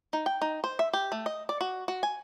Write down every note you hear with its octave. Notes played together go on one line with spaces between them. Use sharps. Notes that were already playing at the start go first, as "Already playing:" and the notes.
D#4
G5
D#4
C5
E5
G4
A3
D#5
D5
F#4
F#4
G#5